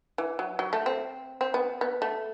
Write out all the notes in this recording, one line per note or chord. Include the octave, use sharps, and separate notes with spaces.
E3
F#3
F#3
A3
C4
C4
B3
B3
A3